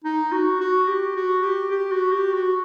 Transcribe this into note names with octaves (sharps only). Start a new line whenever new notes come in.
D#4
F#4
F#4
G4
F#4
G4
G4
F#4
G4
F#4